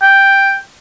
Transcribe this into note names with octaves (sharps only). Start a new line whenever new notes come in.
G5